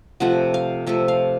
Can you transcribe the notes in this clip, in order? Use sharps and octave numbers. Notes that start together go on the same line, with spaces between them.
C3 F3 A3 F#5
F5
C3 F3 A3 E5
F5